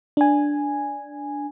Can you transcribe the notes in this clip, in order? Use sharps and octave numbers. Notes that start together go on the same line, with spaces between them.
D4 G#5